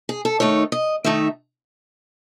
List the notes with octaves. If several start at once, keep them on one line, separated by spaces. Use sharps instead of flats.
G#4
A4
D#3 A3 D#4 C#5
D#5
D#3 A3 D#4 E5